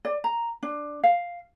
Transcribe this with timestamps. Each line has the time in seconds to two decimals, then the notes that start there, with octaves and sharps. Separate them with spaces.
0.05 D5
0.24 A#5
0.63 D4
1.03 F5